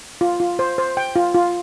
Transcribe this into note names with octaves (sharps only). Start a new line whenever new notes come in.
F4
F4
C5
C5
G5
F4
F4